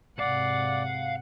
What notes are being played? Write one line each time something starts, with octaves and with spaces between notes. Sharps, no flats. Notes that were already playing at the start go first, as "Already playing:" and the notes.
G#2 C3 D5 F5 F#5